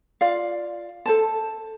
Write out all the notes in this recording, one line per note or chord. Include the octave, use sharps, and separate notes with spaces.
F4 D5 F5
A4 C5 A5